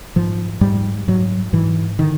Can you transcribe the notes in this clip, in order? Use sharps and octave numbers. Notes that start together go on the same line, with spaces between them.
G#2 F3
G#2 G3
G#2 F#3
G#2 E3
D3 D#3